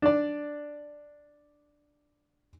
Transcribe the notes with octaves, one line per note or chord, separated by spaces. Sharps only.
D4 D5